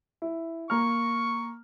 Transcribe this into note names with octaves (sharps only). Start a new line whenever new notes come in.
E4
A#3 A#5 C#6 F6